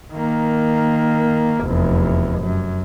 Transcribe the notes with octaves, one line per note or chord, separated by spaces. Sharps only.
D#3 A#3
F1 E2
F#2